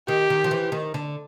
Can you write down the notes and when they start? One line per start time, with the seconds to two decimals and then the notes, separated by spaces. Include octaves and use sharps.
0.08 D#3 G4
0.30 D#3
0.44 F3
0.51 E3
0.72 D#3
0.94 D3